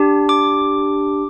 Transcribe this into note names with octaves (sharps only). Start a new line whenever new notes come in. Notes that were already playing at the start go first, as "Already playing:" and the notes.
Already playing: D4 G4
D6